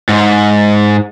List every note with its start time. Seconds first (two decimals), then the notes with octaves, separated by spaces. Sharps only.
0.09 G#2